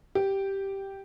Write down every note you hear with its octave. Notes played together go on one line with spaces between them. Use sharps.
G4